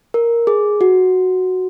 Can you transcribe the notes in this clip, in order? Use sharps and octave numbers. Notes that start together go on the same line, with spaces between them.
A#4
G#4
F#4